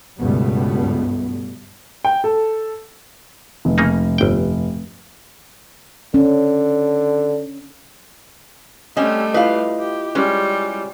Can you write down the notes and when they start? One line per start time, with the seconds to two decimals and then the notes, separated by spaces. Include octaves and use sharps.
0.20 C#2 G2 B2 G3 A3 B3
2.05 G5
2.24 A4
3.65 F1
3.78 C#3 A#3 D#4
4.18 G1 G5
6.14 D3 C#4
8.97 G3 A3 C4 C#4 D#5
9.34 E4 F4 B4 D#5 F5
9.79 G4
10.15 G3 G#3 C#4